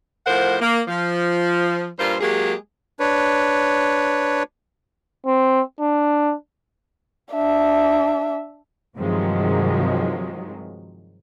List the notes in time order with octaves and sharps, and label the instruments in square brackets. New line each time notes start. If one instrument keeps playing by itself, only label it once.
[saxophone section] A2 F3 A#4 C5 F#5
A#3
F3
G2 A#2 F4 A#4 C5
F#3 G#3 A#3 G4 G#4
[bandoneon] D4 B4 C#5
[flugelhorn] C4
D4
[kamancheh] D4 E5
[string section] G2 C3 D#3 F3 F#3 G#3